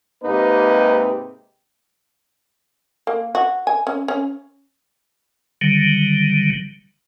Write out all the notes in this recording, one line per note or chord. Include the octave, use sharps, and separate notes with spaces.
G#2 C3 A#3 D#4 G4 B4
A#3
F#4
G#5
C#4
C#4
D3 D#3 F#3 G3